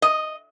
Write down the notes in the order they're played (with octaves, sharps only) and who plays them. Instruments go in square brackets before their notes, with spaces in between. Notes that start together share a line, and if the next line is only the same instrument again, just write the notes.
[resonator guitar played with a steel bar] D#5